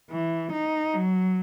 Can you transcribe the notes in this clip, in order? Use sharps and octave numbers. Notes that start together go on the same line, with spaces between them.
E3
D#4
F#3